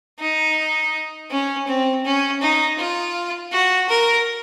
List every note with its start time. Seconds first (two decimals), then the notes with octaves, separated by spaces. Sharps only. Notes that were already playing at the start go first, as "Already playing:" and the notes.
0.19 D#4
1.31 C#4
1.67 C4
2.05 C#4
2.41 D#4
2.78 F4
3.52 F#4
3.89 A#4